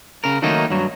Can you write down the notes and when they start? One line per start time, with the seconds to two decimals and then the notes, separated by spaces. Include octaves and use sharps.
0.24 C#3 A#4
0.42 D#3 F#3 A3 A#3 D#4
0.70 G2 F#3